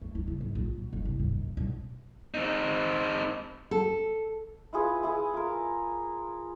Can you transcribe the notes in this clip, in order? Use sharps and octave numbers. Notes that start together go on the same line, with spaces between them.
A3
E4
C#3
G#2
A#1
B2
F#1
C2
G2
D#3
G2
B1
C4 D#4
A4
E4 F4 G#4 B4
E4 G#4
F4 A#4